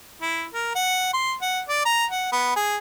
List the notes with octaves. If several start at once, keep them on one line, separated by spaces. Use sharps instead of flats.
E4
A#4
F#5
C6
F#5
D5
A#5
F#5
B3
G#4